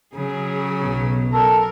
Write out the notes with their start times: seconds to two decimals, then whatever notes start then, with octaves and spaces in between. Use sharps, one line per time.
0.15 C#3 F#3 G#4
0.81 B1
1.33 A4 A#4